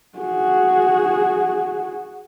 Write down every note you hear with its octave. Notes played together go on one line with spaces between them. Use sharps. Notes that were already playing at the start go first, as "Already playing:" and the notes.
F#4 G#4